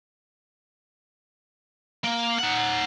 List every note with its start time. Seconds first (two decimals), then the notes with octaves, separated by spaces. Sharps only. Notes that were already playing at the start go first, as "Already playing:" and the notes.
2.04 A#3
2.39 D#4 F#5